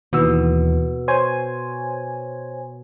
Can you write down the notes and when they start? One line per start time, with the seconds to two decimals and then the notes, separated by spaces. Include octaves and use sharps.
0.13 D#2 B2 E3 E6
1.08 C5 C#5 G#5